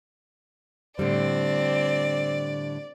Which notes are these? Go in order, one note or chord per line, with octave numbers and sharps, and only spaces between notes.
A2 D3 G3 C4 D5